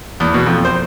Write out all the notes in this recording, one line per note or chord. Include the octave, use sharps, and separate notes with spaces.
E2
B2
F2
C5